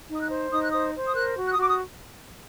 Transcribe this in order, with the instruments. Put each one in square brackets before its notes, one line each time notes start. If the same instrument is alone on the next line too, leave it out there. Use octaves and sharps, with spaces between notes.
[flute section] D#4
D#6
F#6
C5
D#4 D#6
F#6
C5 D#6
C5
D#6
A#4 F#6
F#4
F#6
D#6
F#4 D6
D#6